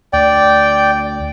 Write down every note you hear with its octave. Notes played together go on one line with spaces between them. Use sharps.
D2 D5 G5